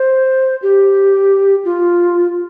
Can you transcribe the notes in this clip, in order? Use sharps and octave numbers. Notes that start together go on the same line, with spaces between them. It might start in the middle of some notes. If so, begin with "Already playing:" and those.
Already playing: C5
G4
F4